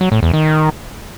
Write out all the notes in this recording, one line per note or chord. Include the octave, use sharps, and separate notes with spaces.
F#3
A2
E2
D#3